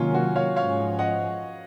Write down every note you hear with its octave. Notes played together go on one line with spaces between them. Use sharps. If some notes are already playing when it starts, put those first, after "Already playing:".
Already playing: C3 D#3 F#3 A#3 C#4 F4
F#4
C#5 F5
G#2 F3 G#3 C#4 C#5 F5
D#5 F#5